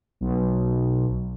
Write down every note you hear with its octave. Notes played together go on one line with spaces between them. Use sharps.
B1